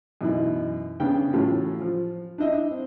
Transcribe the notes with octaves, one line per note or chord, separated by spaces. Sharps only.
F#2 B2 E3 B3 D#4 E4
C#3 B3 C#4 D4 G5
A2 E3 F#3 A3 C#4 F4
F3
D4 E4 D#5 E5
C4